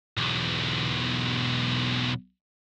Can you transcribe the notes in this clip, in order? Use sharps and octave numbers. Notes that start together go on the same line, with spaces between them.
B1 E2